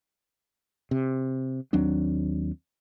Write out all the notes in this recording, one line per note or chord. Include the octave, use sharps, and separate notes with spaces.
C3
D#2 F#3 C4 D4